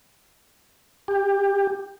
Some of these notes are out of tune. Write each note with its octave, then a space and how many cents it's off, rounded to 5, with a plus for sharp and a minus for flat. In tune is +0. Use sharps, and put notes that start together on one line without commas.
G4 +20